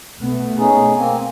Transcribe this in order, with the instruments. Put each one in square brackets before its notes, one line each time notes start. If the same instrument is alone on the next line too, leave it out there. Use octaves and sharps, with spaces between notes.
[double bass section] B2 A3 B3
[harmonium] C#4 D#4 G#4
A#3 C4 G#5